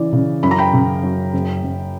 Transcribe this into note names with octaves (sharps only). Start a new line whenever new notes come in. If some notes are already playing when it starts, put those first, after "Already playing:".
Already playing: C#3 E3 D5
C#3
F#2 B5
A#5
G5 B5
C#3
F#2
F#1
F#1